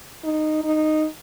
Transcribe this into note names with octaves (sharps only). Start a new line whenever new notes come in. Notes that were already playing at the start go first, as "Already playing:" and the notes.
D#4
D#4